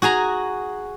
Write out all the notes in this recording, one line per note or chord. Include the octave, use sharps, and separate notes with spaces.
F#4 G#4 G#5 A#5